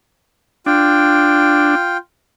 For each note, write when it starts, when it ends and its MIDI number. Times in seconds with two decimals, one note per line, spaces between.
0.66 1.75 62
0.66 1.97 65
0.66 1.97 79